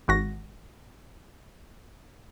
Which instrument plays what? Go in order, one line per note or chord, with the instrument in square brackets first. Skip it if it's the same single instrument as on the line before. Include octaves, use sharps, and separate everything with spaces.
[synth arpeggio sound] G#1 F#4 A#6